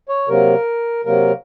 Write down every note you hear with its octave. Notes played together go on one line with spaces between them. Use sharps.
C#5
C3 F#3 A#3 A#4
C3 F#3 A#3 A#4